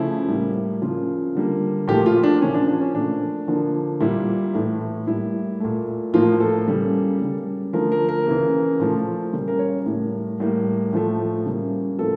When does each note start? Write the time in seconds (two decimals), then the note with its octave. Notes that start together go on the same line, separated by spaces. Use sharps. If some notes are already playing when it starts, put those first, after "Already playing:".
Already playing: C#3 F3 A3 E4
0.28 A2 G3 A#3
0.82 C#3 F3 A#3 F4
1.35 D3 G3 A#3
1.88 A#2 F3 A3 G4
2.06 F4
2.23 D4
2.41 C#3 F3 A#3 C#4
2.54 D4
2.68 D4
2.81 C#4
2.94 A#2 F3 A3 D4
3.48 D3 F3 A#3
4.01 A#2 G3 A#3 E4
4.54 A2 E3 A3
5.07 A2 G3 A#3 E4
5.60 A#2 A3
6.13 A2 F3 A#3 F4
6.40 A4
6.67 C#3 G3 A#3
7.20 C#3 G3 A#3
7.73 D3 F3 A3 A#4
7.92 A#4
8.09 A#4
8.27 C#3 E3 A#3
8.80 A#2 F3 A3
9.33 C#3 G3 A#3
9.48 A#4
9.59 C#5
9.86 A2 G3 A#3
10.40 A2 G3 A#3
10.93 A2 F3 A3
11.46 C#3 G3 A#3
11.99 A2 F3 A#3 A4